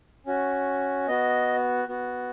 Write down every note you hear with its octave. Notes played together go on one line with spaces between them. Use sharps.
C#4 F#4
B3 F#4 D#5
B3 F#4